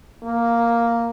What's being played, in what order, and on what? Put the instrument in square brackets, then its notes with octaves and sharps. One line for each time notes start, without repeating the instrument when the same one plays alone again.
[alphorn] A#3